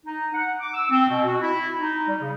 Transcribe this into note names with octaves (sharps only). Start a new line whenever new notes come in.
D#4
F#5
D6
E6
C4
B2
F#4
E4
D#4
G3
C#3